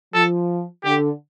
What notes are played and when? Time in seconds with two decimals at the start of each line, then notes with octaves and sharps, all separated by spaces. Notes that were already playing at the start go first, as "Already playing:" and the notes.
0.14 F3 A4
0.84 D3 G4